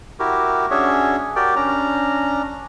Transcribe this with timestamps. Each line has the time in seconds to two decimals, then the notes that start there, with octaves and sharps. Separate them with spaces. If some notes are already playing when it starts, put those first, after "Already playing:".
0.20 E4 F#4 G4 A#4
0.71 C#4 D4 F#4 G#4 C#5 E5
1.36 F#4 G4 A#4 D5 G5
1.56 C#4 D4 A#5